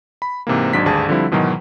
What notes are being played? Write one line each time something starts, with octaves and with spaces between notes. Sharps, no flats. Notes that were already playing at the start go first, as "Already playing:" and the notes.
B5
G#2 C3 E3 A#3
G#1 G#2 F#3 D4 B6
G#1 D2 G2 G#4 A5
D3 F3 G3 C4 E4
G#2 B2 D#3 E3 F#3